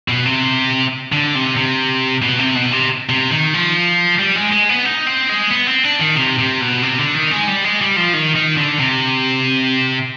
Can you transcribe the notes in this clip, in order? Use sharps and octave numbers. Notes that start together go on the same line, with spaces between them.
B2
C3
D3
C3
C3
B2
C3
B2
C3
C3
D#3
F3
G3
G#3
G#3
B3
D#4
C4
G#3
B3
C4
D4
D#3
C3
C3
B2
C3
D3
D#3
G#3
G3
G#3
G3
F3
D#3
D#3
D3
C3